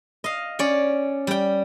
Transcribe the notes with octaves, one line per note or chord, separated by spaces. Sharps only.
D#5 F5
C#4 C#5 D5
G3 G5